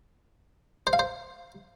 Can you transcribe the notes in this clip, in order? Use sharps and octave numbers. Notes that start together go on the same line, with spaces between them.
C5
F5
C5